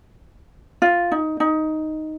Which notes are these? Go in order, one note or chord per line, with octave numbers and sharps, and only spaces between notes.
F4
D#4
D#4